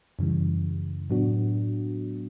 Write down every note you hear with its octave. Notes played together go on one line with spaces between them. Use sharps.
F#2 C#3 E3 G3
A2 F#3 B3 D4 F#4